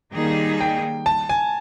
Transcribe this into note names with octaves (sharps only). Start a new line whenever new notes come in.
D#3 G3 A#3 D#4 G#4
G5
A5
G#5